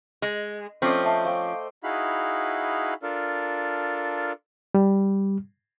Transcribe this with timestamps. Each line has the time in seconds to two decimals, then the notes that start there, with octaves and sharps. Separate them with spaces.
0.22 G#3
0.82 F3 A3 C4 C#4 C5 D5 D#5 F6
1.05 E5 A5
1.25 C5 F5 G5
1.84 D#4 E4 F#4 G#4 F5 B5
3.03 D4 F4 A4 A#4
4.74 G3